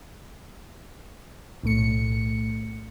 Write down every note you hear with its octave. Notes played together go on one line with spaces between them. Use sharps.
B1 A2 A3 C#7